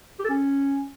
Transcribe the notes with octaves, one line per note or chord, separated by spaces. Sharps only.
G4
A4
C#4